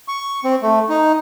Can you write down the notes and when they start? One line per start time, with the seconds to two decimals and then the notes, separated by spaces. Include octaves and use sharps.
0.08 C#6
0.44 C4
0.62 A3
0.89 D#4